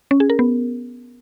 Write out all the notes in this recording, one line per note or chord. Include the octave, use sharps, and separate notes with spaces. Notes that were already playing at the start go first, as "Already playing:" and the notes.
C#4
G#4
A#4
B3